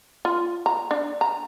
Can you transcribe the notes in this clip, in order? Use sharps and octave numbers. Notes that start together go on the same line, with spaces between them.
F4
A#5
D4
A#5